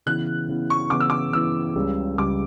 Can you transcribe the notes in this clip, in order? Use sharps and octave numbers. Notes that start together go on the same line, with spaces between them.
C#3 E3 B3 E4 F#6
C#3 E3 B3 E4
C#6
C#3 E3 B3 E4 D6
E6
D6
C#3 E3 B3 E4 E6
C#2 C#3 G3
C#2 C#3 G3 D6